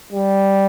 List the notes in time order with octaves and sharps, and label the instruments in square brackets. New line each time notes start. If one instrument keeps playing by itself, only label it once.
[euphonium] G3